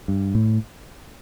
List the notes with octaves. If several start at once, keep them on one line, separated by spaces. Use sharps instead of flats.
G2
A2